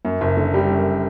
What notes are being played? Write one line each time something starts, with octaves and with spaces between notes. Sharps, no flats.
F#2
F#1
D3
G3
F#2